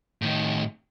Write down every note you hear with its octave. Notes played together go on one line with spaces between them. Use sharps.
A2 D#3